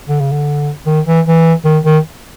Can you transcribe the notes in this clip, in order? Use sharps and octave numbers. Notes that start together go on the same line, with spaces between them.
D3
C#3
D3
D#3
E3
E3
D#3
D#3